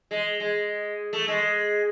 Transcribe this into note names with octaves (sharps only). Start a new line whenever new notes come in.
G#3
G#3
A3
G#3